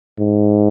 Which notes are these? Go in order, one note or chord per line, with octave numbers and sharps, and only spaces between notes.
G#2